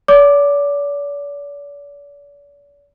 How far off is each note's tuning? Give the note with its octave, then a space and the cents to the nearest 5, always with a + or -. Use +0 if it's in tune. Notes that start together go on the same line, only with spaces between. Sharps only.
D5 -45 D6 +5